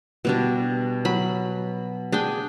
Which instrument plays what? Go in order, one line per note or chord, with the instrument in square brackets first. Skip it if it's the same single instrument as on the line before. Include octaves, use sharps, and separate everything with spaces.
[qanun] B2 G3 D4
F#3 B5
D4 G#4 G5 G#5